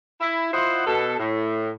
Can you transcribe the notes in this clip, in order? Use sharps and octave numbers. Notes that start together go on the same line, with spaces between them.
E4
E4 F4 C5 D#5 F#5
B2 A4
A2